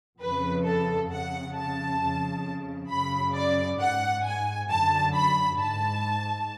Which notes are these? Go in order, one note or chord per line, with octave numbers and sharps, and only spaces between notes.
F2 C#3 B4
A4
F2 C#3 F#5
A5
F2 C#3
F#2 C#3 B5
D5
G#2 F#5
G#5
F#2 D3 A5
B5
G#2 A5